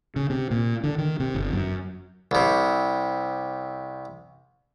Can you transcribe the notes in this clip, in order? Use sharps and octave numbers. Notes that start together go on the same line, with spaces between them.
C#3
C3
A#2
D3
D#3
C3
G1
F#2
C2 C3